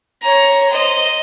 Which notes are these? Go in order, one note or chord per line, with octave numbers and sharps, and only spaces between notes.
C#5 A#5
C5 D#5